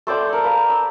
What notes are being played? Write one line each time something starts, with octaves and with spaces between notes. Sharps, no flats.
A3 C5 D5 G5
A4 A#4
B4 F5 A#5
E6